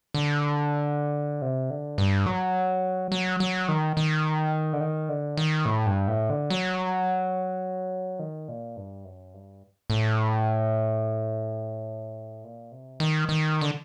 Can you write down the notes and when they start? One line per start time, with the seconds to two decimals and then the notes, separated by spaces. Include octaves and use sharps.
0.14 D3
1.42 C3
1.70 D3
1.98 G2
2.26 F#3
3.12 F#3
3.40 F#3
3.68 D#3
3.97 D#3
4.73 D3
4.80 D#3
5.09 D3
5.37 D#3
5.66 A2
5.86 G2
6.08 A2
6.29 D3
6.50 F#3
8.19 D#3
8.48 A#2
8.77 G2
9.05 F#2
9.34 G2
9.90 A2
12.44 A#2
12.72 C3
13.00 D#3
13.29 D#3
13.61 D3